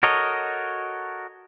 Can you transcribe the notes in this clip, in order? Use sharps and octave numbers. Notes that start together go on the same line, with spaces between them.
F#4 A4 A#4 C#5 D#5